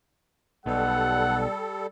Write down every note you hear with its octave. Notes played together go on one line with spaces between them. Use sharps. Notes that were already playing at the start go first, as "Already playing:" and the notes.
B1 B2 G3 A4 F#5